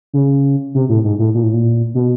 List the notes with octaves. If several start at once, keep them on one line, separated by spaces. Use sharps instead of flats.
C#3
C3
A2
G#2
A2
A#2
A2
A#2
B2